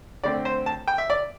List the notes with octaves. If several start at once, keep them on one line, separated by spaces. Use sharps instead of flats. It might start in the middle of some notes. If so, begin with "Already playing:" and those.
D3 A3 C4 D5
C5
A5
G5
E5
D5